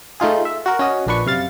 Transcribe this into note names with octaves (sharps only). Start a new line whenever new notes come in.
A3 D#4 F4 G#4
E5
F#4 A#4
C#4 F#4 D#5
A#1 A#2 D4 B4 C#6
F#2 C3 F5 A6